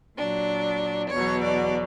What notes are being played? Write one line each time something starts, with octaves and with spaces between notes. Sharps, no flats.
A#2 F#3 D4
E2 B2 F#3 C#5
D5